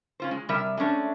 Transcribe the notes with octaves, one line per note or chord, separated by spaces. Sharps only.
C#4 F4 C5
G#3
C3 G3 A#4 E5
G#3 A3 C#4 D4